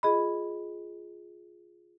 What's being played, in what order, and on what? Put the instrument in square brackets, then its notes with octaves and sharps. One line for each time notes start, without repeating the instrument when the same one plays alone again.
[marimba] F4 G#4 D#5 B5